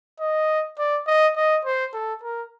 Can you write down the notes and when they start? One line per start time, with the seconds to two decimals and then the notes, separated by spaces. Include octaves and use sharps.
0.20 D#5
0.79 D5
1.07 D#5
1.36 D#5
1.65 C5
1.93 A4
2.23 A#4